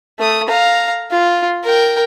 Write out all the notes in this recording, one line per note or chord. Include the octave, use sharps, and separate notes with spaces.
A3 D#6
F5 A#5
F4
A#4 G5